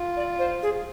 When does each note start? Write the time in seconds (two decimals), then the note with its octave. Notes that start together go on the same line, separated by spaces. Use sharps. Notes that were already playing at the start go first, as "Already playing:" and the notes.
Already playing: F4
0.17 D5
0.39 C5
0.62 G#4